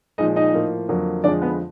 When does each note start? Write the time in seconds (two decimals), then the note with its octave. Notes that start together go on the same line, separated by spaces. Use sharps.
0.18 A#2 F3 G#3 D#4 D#5
0.36 D#4 D#5
0.54 A2 F3 A#3
0.89 F2 D3 F#3 A#3
1.24 F2 D3 F3 G#3 D4 D5
1.41 B3 B4